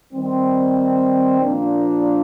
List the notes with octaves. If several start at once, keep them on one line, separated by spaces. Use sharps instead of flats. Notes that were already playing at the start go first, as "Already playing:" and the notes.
D#3 G3 C4
A#2 F3 A#3 D4